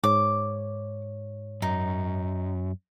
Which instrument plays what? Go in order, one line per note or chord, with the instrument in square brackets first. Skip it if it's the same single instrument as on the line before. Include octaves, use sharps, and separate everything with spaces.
[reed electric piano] G#2 C#5 [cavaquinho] D6
[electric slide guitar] F#2 [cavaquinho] D#4